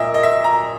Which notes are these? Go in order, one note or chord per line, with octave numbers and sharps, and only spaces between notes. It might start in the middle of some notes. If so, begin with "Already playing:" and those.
Already playing: A#2 A#4 D#5 E5
D#5
E5
A#5